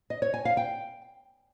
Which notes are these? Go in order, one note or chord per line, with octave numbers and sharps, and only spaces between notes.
D#5
C#5
G#5
F5
G5